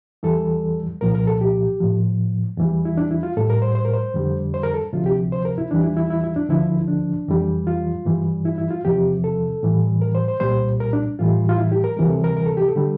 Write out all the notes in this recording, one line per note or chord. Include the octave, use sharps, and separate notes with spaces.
E2 E3 G3 A4
C2 A#2 F3 A#4
A#4
A4
G4
A2 F3
E2 E3 G3
E4
D4
E4
F4
A2 G3 A4
A#4
C5
C5
A#4
C5
F2 D3 G3
C5
A#4
A4
D2 C3 F3 F4
G4
C5
A#4
E4
E2 E3 G3 D4
E4
E4
E4
E4
D4
D2 D3 F3 E4
D4
F2 E3 G3
F4
G2 E3 G3
E4
E4
F4
E2 C3 F3 G4
A4
A2 E3 G3
A#4
C5
C5
C2 A#2 G3 C5
A#4
D4
A2 E3 G3 F4
F4
E4
G4
A#4
D2 C3 E3 G3 A#4
A4
A#4
A#4
A4
G4
A4
D3 G3